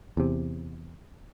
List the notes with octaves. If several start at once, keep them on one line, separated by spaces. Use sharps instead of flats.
E2 C3